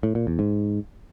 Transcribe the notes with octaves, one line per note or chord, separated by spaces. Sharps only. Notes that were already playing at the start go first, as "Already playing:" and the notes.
A2
A#2
E2
G#2